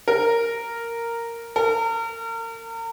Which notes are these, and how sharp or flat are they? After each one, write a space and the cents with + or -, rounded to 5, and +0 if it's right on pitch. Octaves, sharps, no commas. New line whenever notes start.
A#4 -5
A#4 -35